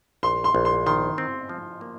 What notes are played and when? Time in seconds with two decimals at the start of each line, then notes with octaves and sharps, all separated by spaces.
0.23 A#1 C6
0.44 C6
0.55 A#1
0.65 C6
0.86 D#3 C6
1.18 C4
1.49 F3
1.81 A#3